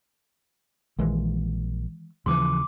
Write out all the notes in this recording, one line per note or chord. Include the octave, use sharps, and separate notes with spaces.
A#1 D#3 E3 G#3
D#2 C#3 E3 F3 C6 D6